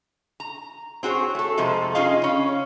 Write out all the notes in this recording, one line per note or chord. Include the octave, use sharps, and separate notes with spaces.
A#5
C4 F#4 G#4 C#5
A3 A4
F2 C3 F3 G#3 A3
C#4 D#4 F4 G#4 D#5 F5
C#3 C#4